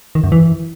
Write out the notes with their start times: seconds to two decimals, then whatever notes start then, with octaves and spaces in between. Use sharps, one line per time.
0.15 D#3
0.24 F#2
0.32 E3